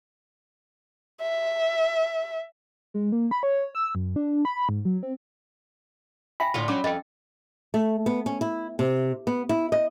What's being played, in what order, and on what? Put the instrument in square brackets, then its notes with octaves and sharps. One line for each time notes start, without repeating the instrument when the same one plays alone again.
[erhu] E5
[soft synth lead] G#3
A#3
B5
C#5
E6
F#2
D4
B5
G#2
F#3
C4
[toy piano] E5 G5 G#5 [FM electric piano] B5
[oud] A2 D3 F4
[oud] F#3 [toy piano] C#4 D6
[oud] F2 [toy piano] D#5 G5
[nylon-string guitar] A3
B3
C#4
E4
C3
B3
E4
D#5